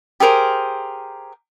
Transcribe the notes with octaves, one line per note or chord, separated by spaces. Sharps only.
G4 G#4 A#4 C5